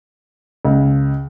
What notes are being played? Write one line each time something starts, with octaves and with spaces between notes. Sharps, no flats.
C#2